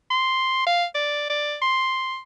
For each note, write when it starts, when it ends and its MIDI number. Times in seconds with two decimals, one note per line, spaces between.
0.11 0.66 84
0.67 0.85 77
0.95 1.28 74
1.30 1.56 74
1.62 2.19 84